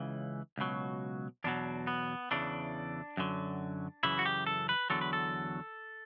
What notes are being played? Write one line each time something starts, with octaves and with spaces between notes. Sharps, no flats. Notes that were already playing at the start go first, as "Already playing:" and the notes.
Already playing: C#2 C#3 E3
C#2 B2 F#3
E2 B2 F#3 D4
B3
E2 C#3 E3 D4
F#2 D3 F#3
F#2 C#3 E3 E4
F#4
G4
A4
B4
E2 D3 F#3 A4
B4
A4